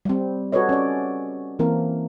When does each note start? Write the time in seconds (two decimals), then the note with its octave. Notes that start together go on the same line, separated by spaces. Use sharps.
0.05 G3 C4
0.52 F#4 A4 B4 C#5 D#5
0.69 C#4 D5
1.59 E3 A#3 C4 A#4